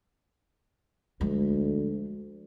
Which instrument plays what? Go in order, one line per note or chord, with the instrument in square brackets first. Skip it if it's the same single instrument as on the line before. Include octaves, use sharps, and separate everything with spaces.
[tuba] D2 [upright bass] F3 G#3